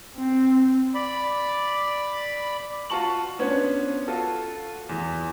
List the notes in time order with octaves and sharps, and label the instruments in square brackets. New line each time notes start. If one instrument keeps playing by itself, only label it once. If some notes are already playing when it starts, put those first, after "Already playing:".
[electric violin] C4
[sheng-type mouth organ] D5 B5
[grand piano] F4 F#4 A5 C#6 F#7
B3 C#4 D4 C5 C#5
F4 F#4 A4
E2